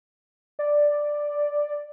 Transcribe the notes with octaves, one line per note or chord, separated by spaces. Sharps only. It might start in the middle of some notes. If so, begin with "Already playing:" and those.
D5